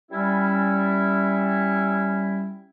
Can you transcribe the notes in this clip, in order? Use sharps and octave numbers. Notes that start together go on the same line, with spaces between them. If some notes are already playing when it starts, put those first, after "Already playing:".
G3 C#4 E4